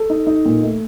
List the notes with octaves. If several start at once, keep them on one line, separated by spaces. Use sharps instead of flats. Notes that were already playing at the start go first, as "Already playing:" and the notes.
Already playing: A4
D#4
D#4
A#2
A3